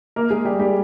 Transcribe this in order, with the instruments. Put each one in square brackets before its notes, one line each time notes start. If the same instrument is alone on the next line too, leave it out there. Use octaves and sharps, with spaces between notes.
[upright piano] A#3 A#4
G#3 G#4
G3 G4
G3 G4